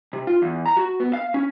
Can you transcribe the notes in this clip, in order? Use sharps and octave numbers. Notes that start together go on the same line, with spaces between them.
C3
F4
E2
A#5
F#4
B3
F5
C#4